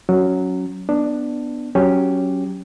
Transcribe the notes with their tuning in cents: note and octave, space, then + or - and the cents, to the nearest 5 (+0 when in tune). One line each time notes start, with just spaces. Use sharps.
F#3 +0 C#4 +0
B3 +0 D4 +10
F#3 +10 C#4 +0 G4 +0